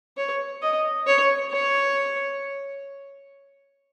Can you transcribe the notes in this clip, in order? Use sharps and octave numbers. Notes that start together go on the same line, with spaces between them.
C#5
D#5
C#5
C#5